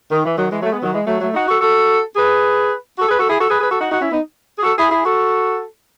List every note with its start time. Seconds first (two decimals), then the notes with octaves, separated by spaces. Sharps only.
0.11 D#3
0.25 E3
0.38 D#3 F#3
0.52 E3 G#3
0.62 F#3 A3
0.72 G#3 B3
0.83 D#3 F#3
0.93 E3 G#3
1.07 F#3 A3
1.21 F#3 A3
1.34 D#4 F#4
1.48 F#4 A4
1.61 F#4 A4
2.16 G#4 B4
2.99 F#4 A4
3.09 G#4 B4
3.19 F#4 A4
3.29 E4 G#4
3.41 F#4 A4
3.50 G#4 B4
3.60 G#4 B4
3.71 F#4 A4
3.81 D#4 F#4
3.92 D#4 F#4
4.01 C#4 E4
4.12 B3 D#4
4.58 G#4
4.63 F#4 A4
4.77 E4 G#4
4.91 E4 G#4
5.05 F#4 A4